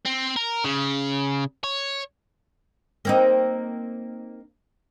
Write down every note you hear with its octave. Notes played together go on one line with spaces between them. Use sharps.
C4
A#4
C#3
C#5
A#3 C4 D#4